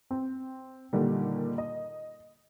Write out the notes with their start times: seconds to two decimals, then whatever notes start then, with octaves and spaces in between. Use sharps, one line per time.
0.11 C4
0.93 A#2 D3 D#3 G3
1.58 D#5